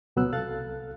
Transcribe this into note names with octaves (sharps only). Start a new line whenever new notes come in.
C#2 B2 F#3 B3 E6 F#6
C2 A4 F5 F#6 A6